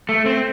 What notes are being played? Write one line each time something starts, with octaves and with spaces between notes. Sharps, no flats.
A3
C4